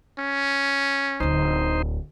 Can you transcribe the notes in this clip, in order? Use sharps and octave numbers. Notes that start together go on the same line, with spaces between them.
C#4
D1 D2 D#4 C5